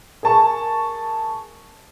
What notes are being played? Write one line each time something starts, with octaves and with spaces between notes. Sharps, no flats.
G#4 A#4 A5 C#6